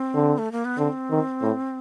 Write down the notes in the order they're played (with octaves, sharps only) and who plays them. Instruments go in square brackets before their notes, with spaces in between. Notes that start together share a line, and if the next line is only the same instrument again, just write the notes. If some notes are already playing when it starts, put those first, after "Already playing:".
Already playing: [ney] C4
[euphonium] D3
[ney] A3
A#3
B3
[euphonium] D3 [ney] C4
[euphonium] D#3
A2